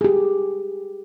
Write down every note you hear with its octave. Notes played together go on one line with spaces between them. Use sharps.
G4 G#4